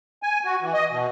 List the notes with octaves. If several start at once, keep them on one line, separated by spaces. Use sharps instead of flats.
G#5
F#4
E3
D#5
B2